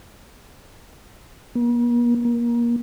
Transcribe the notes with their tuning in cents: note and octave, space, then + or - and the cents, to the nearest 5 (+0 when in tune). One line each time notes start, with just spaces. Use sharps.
A#3 +45
A#3 +25